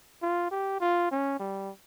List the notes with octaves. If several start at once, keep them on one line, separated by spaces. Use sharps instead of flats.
F4
G4
F4
C#4
G3